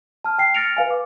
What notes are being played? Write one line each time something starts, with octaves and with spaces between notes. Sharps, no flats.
A5 F6
G5 C7
F6 A6 A#6 C#7 D7 F7
B4 F5 G#5
D6